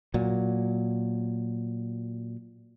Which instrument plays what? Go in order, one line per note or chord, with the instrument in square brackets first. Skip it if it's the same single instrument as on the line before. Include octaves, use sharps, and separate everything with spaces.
[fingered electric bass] A#2 F#3